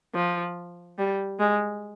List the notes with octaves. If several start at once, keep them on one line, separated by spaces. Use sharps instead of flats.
F3
G3
G#3